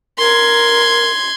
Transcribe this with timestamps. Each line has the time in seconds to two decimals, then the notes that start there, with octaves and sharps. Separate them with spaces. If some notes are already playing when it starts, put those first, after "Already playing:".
0.19 A#4 C6 G#6